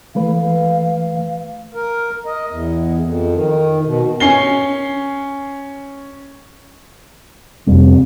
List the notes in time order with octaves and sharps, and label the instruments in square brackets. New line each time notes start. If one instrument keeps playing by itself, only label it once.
[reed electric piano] E3 A3 B4 [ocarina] F5
[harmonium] A#4
D#5
E2
F2
D#3
B2
[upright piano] C#4 C7 G7
[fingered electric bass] F2 G3 [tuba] C3